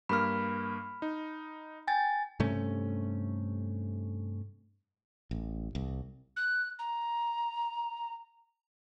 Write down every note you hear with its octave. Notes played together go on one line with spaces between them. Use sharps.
G2 A#3 B5 F6
D#4
G5 G#5 A6
G2 C3 A3 C#4
A1
C2
F#6
A#5